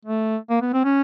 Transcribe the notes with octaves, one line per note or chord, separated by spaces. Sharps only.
A3
A#3
B3
C4
C#4